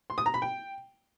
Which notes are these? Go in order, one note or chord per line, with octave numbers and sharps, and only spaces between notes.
C6
D#6
A#5
B5
G5